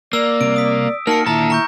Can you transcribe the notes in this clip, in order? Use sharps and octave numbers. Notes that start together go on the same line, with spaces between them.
A#3 D5 E6
C2 C3 D7
D#6 B6
A#3 D#4 F#4 A#4 A5 F6 A#6 C#7
D#2 A#2 D3 E4 A5 A#5
A#5 C#6 G6